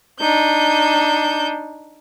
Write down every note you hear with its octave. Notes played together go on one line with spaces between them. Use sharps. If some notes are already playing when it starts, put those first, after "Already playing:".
D4 D#4 G6